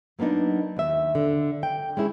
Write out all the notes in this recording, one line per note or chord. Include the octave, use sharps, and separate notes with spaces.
F#3 A#3 B3 D4 D#4
D#2 E5
D3
G5
G#3 C#4 E4 G#4